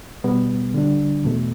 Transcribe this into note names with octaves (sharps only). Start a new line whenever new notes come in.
B2 G3 B3
D3 G3 D4
E2 B2 A3